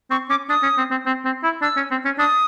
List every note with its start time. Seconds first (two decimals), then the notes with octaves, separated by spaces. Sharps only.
0.11 C4 C#6
0.29 C#4 D6
0.49 D4 D#6
0.63 C#4
0.78 C4
0.91 C4
1.06 C4
1.25 C4
1.43 E4
1.62 D4 E6
1.77 C#4
1.91 C4
2.05 C#4
2.19 D4 D#6